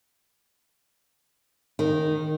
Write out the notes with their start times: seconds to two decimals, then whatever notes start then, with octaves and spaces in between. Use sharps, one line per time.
1.79 D#3